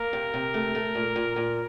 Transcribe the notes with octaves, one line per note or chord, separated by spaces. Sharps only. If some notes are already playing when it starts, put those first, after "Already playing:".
Already playing: A#3 A#4
C3
C3
A3
A3
A#2
A#2
A#2